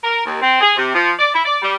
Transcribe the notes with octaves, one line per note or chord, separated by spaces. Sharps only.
A#4
D#2
C4
G#4
C3
F3
D5
E4
D5
G3